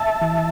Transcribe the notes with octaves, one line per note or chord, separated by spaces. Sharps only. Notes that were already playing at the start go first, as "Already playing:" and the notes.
Already playing: E5 A5
E3